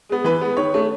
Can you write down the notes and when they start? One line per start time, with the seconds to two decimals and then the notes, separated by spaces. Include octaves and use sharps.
0.09 G#3 B3
0.24 E3 B4
0.41 G#3 B3
0.57 D#3 C#5
0.74 A3 C#4